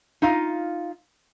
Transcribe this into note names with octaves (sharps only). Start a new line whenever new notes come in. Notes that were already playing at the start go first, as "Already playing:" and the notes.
D#4 F4 F5